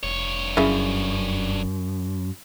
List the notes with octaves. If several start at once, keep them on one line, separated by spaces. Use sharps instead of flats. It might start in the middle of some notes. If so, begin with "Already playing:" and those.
F1 G2 C#5
F#2 C#3 E4